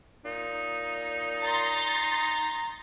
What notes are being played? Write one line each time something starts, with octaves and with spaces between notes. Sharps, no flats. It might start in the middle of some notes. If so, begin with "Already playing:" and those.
A#2 D#4
A#5 C6 A6